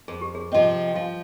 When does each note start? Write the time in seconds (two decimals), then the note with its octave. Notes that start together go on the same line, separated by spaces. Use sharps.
0.08 F2 G#4
0.21 G4
0.35 G#4
0.52 C3 F3 C4 D#5
0.88 G5
0.96 F3 F5